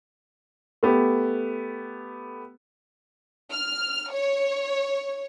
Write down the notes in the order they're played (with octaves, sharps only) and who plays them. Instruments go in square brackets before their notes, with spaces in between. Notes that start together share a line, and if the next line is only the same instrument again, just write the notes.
[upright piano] A3 B3 G4
[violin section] F6
C#5